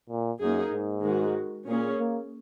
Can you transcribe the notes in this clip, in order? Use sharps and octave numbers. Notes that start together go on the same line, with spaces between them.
A#2
F#2 A#3 D#4 G#4
G#2
D#3 G#3 F#4
A#2 A#3 C#4 G#4
A#3